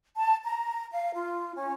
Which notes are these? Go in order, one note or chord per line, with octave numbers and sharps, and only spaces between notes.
A5
A#5
F5
F4
C#4